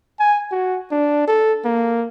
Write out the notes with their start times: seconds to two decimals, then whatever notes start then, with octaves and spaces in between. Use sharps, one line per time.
0.20 G#5
0.51 F#4
0.91 D4
1.27 A4
1.64 A#3